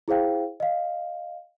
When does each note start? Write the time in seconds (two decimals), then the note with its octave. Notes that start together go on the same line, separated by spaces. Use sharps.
0.08 E4 G#4 C5 F5 G5
0.60 D#5 F5